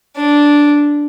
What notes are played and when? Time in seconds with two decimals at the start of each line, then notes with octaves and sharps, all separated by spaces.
0.16 D4